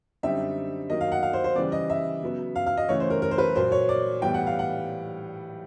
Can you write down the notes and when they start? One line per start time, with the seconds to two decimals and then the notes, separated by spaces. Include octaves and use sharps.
0.23 F#2 D3 G3 C4 D#4 E5
0.90 D#3 F#3 A#3 D#4 D#5
1.01 F5
1.12 F#5
1.23 F5
1.33 C5
1.44 C5
1.56 C#3 E3 G3 D5
1.72 D#5
1.90 E5
2.22 C#3 F#3 B3
2.56 F5
2.66 F5
2.77 D#5
2.89 C#3 E3 A3 C#5
3.00 C5
3.10 A#4
3.22 A#4
3.31 C5
3.38 B4
3.55 A#2 F#3 A#3 C5
3.72 C#5
3.89 D5
4.21 A2 E3 G3 B3 G5
4.34 F#5
4.47 F5
4.59 F#5